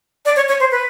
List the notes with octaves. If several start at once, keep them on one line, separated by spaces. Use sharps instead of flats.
D5
C#5
C#5
C5
B4